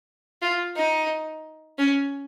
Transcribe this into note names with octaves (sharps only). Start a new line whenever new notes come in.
F4
D#4
C#4